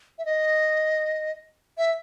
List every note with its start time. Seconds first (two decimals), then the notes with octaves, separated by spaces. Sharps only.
0.18 E5
0.25 D#5
1.78 E5